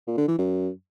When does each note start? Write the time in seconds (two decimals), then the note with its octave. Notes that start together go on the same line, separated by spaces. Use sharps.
0.07 A#2
0.18 D3
0.28 E3
0.39 F#2